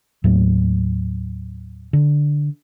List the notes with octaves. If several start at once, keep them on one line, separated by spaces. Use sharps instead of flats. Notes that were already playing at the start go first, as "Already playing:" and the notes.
D#2 A2 F#3
D3